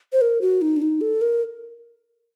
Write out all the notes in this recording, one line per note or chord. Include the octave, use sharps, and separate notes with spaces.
C5
A#4
F#4
D#4
D4
D#4
A4
A#4